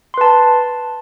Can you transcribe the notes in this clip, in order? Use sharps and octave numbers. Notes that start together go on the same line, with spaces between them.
B4 A5 C6